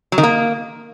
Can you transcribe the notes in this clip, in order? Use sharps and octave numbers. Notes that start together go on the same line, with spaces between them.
F#3
D#3
A#3